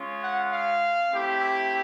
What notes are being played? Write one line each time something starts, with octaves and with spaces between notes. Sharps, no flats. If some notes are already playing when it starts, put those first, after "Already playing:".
Already playing: G#3 C#4 F4
F#5
F5
A3 C4 E4 G4
E5